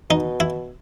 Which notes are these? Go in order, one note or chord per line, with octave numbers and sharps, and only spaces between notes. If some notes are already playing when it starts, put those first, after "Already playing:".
B2 D#4
E4